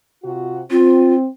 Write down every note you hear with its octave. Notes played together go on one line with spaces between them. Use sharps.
C3 F4 F#4
C4 F4